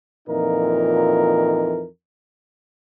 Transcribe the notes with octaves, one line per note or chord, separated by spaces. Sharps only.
F2 A#2 E3 D#4 A#4